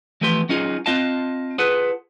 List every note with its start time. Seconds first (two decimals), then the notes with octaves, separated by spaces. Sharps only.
0.21 E3 F3 A3 B3 G4 C6
0.49 F#3 C#4 D#4 F4 G#4
0.86 C4 F4 D#5 F5 A5
1.58 F4 G#4 A4 B4 F#5